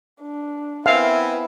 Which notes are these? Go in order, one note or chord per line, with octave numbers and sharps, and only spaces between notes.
D4
B3 C4 E4 E5 F5 G#5